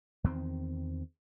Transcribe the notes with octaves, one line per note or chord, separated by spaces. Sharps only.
E2 D#3 C4